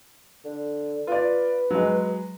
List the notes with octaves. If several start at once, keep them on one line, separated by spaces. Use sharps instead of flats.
D3
F4 B4 D5
F#3 G#3